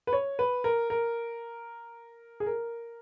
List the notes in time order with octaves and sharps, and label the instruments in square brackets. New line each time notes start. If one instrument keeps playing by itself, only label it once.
[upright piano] B4
C#5
B4
A#4
A#4
G#4
A#4